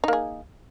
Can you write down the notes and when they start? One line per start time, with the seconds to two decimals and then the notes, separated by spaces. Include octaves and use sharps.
0.04 D#4
0.08 A#3
0.13 G#4